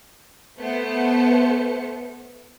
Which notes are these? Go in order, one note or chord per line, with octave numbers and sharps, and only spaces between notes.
A3 B3 C5 C#7